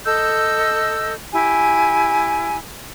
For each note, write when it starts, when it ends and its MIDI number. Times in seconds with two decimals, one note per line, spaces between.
0.05 1.13 69
0.05 1.13 75
0.05 1.13 88
0.05 1.13 91
1.32 2.56 64
1.32 2.56 67
1.32 2.56 80